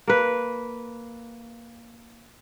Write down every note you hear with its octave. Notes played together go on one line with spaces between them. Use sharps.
A#3 B4